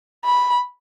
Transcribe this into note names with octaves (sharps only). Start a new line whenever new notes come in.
B5